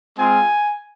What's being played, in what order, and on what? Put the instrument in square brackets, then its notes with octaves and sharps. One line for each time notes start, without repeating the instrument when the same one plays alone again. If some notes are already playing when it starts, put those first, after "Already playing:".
[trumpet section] G#3 C4 F4 G#5